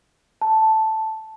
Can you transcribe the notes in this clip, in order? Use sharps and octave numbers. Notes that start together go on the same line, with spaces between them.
A5